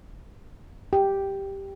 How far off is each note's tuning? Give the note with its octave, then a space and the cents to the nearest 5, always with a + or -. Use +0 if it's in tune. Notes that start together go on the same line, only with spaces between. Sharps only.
G4 +0